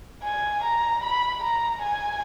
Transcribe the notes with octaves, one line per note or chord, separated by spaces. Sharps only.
G#5
A#5
B5
A#5
G#5